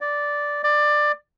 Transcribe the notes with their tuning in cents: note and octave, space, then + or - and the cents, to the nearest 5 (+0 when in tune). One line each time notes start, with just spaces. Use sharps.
D5 -5
D5 +15